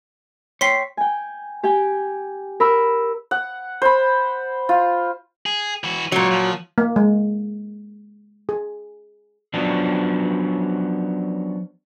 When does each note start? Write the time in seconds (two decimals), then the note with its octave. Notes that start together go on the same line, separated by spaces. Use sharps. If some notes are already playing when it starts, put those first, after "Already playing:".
0.61 C#5 G5 C6 B6 C7
0.97 G5 G#5
1.63 G4 G5 G#5
2.60 A#4 B5 E6
3.31 F#5
3.82 C5 B5
4.69 F4
5.46 G#4
5.84 E3 F#4
6.12 C#2 A#2 F#3 C#5
6.31 F3
6.78 A#3
6.96 G#3
8.49 G#4
9.54 F3 F#3 B3 C#4 D4